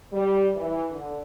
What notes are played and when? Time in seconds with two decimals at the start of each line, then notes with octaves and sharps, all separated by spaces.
0.12 G3
0.56 E3
0.91 D3